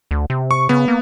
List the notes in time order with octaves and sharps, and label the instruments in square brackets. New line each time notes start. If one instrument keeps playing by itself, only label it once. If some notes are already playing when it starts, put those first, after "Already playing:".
[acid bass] D2
C3
[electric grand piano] C#6
[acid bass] C#3 [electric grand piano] B3
[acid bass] A#3